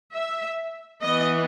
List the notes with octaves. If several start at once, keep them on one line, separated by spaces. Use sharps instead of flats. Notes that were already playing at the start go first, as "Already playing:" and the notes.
E5
E3 B3 D#5